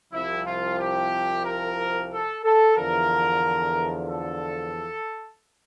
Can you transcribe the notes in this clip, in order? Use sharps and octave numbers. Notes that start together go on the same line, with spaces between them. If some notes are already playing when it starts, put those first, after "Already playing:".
C2 C3 F3 E4
F4
G4
A#4
A4
A4
E2 D3 F3 A#4
A4